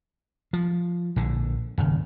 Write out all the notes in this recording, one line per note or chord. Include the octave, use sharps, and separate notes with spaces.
F3
A#1 D3
D#1 G#1 C#3